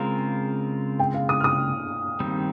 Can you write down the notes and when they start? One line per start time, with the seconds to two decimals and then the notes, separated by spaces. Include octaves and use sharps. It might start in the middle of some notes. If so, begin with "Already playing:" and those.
Already playing: C#3 G#3 C4 F4 A#4 F5
0.99 G5
1.14 F5
1.29 D#6
1.40 F6
1.44 D#6
2.20 D#3 G3 C4